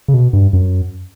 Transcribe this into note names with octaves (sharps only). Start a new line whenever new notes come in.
C#3
B2
G2
F#2